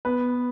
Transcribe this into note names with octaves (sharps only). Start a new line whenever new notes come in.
B3 B4